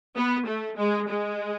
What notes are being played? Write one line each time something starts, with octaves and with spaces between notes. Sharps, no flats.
B3
A3
G#3
G#3